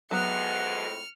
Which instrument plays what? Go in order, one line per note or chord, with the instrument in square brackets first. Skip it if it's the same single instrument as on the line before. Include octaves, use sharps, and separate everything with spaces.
[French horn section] F2 A2 G#3 [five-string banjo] F#3 B3 [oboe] F#5 [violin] F6 C#7